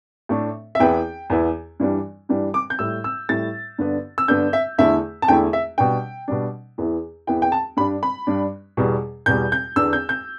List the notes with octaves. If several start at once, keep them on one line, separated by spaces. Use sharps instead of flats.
A2 A3 D4
E5
E2 E3 B3 E4 G5
E2 E3 B3 E4
G2 E3 G3 D4
G2 E3 G3 D4
D6
G6
A2 G3 E4 E6
E6
A2 G3 E4 A6
G2 D3 B3 D4
E6
G2 D3 B3 D4 G6
E5
E2 D3 A3 E4 E5
A5
E2 D3 A3 E4 G5
E5
B2 G3 D4 G5
B2 G3 D4
E2 E3 B3 E4
E2 E3 B3 E4 G5
G5
A5
G2 G3 D4 B5
B5
G2 G3 D4
E2 B2 G3
E2 B2 G3 G6
G6
E2 D3 B3 D4 E6
G6
G6